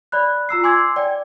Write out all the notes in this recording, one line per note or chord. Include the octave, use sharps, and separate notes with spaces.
D5 B5 F#6
F4 A#5 E6 C7
G#5 C6 D6 E6 G#6
D5 G5